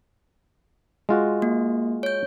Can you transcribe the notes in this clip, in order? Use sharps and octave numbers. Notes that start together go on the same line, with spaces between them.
G#3 F4 F#4
A#3
C#5 G6